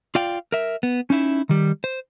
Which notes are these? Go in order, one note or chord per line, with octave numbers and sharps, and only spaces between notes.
F4 D5 F5 G5
A#4 E5
B3
C#4 D#4 E4 E5
D#3 G3
C5